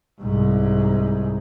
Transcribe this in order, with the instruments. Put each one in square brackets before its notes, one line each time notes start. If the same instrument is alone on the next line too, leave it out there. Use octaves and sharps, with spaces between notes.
[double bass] C2 G#2